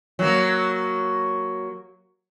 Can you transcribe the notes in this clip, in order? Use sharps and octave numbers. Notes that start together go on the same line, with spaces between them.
F#3 A#3